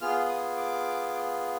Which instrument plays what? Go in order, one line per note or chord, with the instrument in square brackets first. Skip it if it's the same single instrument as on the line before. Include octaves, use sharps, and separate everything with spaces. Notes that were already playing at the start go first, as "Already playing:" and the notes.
[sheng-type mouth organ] B3 F4 G#4 F6
D#6
D6